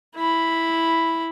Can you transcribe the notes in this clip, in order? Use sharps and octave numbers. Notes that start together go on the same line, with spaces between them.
E4 B5